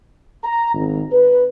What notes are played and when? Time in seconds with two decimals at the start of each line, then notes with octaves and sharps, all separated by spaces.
0.44 A#5
0.74 G#1
1.12 B4